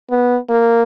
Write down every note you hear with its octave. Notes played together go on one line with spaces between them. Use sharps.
B3
A#3